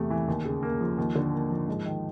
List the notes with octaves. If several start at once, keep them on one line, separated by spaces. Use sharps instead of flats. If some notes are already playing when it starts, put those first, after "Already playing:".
Already playing: E2 C3 A3
E3
D#2
C#3
A#3
F3
D#2
D3
A#3
F3
G#2
D#3